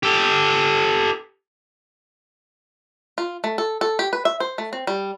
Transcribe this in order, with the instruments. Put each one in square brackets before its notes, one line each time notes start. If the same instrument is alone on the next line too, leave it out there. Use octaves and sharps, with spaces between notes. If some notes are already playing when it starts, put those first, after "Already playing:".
[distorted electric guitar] G4 A4
[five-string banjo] F4
A3
A4
A4
G4
B4
E5
C5
A3
C4
G3